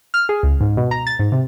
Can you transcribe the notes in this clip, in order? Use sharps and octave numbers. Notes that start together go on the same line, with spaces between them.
F6
G#4
C#2
G#2
B2
A#5
A6
G#2
C3